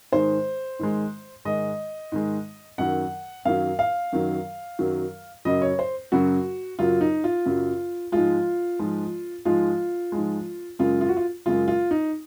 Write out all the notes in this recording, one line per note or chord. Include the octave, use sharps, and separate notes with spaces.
G#2 D#3 G#3 C5
G#2 D#3 G#3
G#2 D#3 G#3 D#5
G#2 D#3 G#3
F#2 D#3 F#3 F#5
F#2 D#3 F#3 F5
F5
F#2 D#3 F#3
F#2 D#3 F#3
F#2 C#3 F#3 D#5
C#5
C5
F#2 C#3 F#3 F#4
F#2 C#3 F#3 F4
D#4
F4
F#2 C#3 F#3
G#2 F3 G#3 F4
G#2 F3 G#3
G#2 F3 G#3 F4
G#2 F3 G#3
F#2 C#3 G#3 F4
F4
F#4
F4
F#2 C#3 G#3 F4
F4
D#4